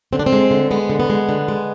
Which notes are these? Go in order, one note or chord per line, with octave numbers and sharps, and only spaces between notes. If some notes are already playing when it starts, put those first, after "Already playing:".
D3 C4
D4
C4
G#3
D3
G#3 B3
D3
B3
G#3
D3
G#3